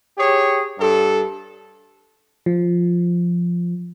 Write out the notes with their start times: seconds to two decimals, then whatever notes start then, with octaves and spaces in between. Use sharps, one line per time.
0.18 G4 G#4 C#5
0.79 G2 A4
2.46 F3